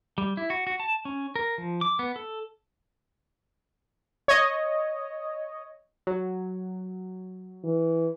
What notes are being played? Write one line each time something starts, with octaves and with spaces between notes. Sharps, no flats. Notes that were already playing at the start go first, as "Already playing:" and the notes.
G3
E4
F#4
F#4
A5
C#4
A#4
F3
D6
B3
A4
C#5 D#5
F#3
E3